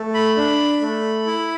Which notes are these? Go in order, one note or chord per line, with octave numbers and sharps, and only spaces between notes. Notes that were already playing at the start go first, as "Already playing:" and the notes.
Already playing: A3
B5
D4
A3
E4